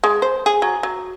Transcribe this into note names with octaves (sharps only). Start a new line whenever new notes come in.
G#3
C5
G#4
F#3
F#3